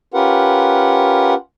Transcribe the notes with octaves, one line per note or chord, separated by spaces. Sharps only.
C#4 F4 G4 A#4 B4 F#5